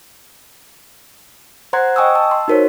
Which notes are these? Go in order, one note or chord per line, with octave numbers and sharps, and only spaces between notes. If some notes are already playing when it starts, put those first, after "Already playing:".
C5 F#5 A#5 C6 F#6 G#6
D#5 G5 G#5 C#6 D#6 E6
A5 E6
C6
D#4 F#4 A#4 C5 C#5